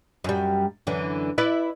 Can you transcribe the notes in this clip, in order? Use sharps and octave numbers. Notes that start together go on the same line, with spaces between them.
F#2 G3
F#2 D3 E3
E4 B4 D5